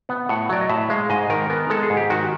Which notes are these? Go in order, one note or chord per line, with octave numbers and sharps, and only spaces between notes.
B3 F#5
A2 F#5
F#3 D5
D#5
A2 E5
G#3 F5
G#2 D#5
D#3 A#4
B3 A#4
G#3 A4
G#4
G#2
G4
D#3 F#4